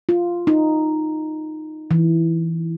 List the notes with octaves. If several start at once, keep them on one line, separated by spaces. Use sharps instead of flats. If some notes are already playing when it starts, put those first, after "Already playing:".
F4
D#4
E3